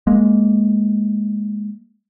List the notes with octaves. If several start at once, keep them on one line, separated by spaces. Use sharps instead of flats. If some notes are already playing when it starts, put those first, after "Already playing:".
G#3 A#3